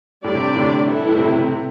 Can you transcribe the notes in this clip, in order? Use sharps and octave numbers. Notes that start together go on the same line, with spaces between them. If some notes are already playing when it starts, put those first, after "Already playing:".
A2 G3 D4 G4 D5
C3
A2 D3
E3 G3 E4 A4
A2
C3
C3
C3
C3